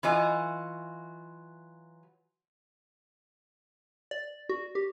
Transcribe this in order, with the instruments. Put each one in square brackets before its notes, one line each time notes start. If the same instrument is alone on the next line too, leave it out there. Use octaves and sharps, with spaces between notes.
[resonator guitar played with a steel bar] E3 F#3 F4 F#4 D#5 G#5
[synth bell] D5
F#4
G4